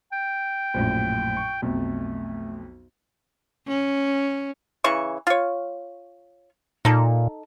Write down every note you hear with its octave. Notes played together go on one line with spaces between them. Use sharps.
G5
A#1 F#2 A2
C#6
B1 F2 A3
C#4
C#3 E3 C#6
F4 C#5
A#2 D#4 A4